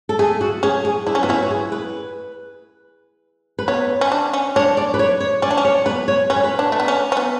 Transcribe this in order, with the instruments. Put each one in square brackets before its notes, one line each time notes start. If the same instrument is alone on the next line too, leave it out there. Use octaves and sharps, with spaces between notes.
[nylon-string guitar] A4
[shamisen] A3 [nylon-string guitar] G#4
[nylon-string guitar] F#4
[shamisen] C#4 [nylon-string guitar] G#4
[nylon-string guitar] G#4
[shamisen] D4 [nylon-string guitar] E4
[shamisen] C#4
[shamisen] B3 [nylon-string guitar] F#4
[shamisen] C#4 [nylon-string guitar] E4
[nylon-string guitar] F#4
G#4
B4
B4
[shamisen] B3 [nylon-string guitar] C#5
[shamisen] C#4
D4
C#4
[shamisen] D4 [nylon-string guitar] C#5
[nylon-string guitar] D5
B4
C#5
C#5
[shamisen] C#4 [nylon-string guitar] D5
[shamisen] D4
C#4
[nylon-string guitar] C#5
[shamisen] B3 [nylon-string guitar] B4
[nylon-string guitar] C#5
[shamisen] C#4 [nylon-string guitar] B4
[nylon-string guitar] C#5
B4
[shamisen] D4
A3
B3
C#4
C#4
B3